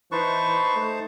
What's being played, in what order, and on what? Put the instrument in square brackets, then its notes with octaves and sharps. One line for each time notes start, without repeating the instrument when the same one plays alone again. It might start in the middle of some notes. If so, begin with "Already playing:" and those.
[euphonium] E3 [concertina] D#4 C5 A5 [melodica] B4 C#6
[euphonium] A3